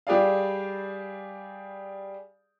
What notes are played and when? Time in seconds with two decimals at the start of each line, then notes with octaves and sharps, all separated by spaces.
0.07 G3 G4 G#4 D5 F5